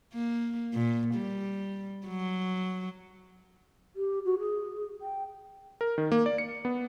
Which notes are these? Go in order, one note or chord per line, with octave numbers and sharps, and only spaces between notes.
A#3
A#2
G3
F#3
G4
F#4
G#4
G5
A#4
D#3
A#3
D5
C#7
B3